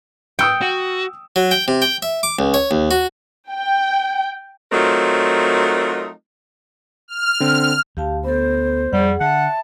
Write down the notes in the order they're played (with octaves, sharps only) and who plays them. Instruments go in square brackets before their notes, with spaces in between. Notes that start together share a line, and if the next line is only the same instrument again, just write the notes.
[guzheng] G5 [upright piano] D#6 E6 C#7
[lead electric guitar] F#4
[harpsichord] F#3
G5
C3
G5
E5
D6
C#2
C#5
D#2
F#4
[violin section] G5
[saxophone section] F#3 A3 C4 D#4 F4 A#4
[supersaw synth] F6
[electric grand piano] D3 C4
[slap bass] D2 [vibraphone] G4 F5 A5
[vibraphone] B3 A4 [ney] C5
[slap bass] F2 [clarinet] G3 [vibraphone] G#4 F#5
[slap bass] D3 [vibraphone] E5 [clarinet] F#5 [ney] A5